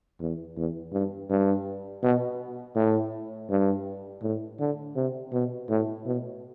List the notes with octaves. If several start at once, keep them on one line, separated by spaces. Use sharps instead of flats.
E2
E2
G2
G2
B2
A2
G2
A2
D3
C3
B2
A2
B2